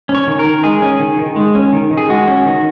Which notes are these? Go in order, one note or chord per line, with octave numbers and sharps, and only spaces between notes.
C#4
C#5
D#3
A#4
D#3
G#3 G#4
C#4
D#3
D#3
G#3
C#4
D#3
D#3
G#4
G#3 F#4
C#4
D#3